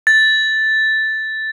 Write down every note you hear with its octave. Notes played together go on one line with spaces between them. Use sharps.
A6